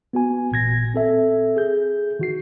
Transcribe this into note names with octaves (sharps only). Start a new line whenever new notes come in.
B3 F#4 G#5
A1 A#2 G#6 A#6
C4 A4 E5
G#4 G6
D#3 F#4 C7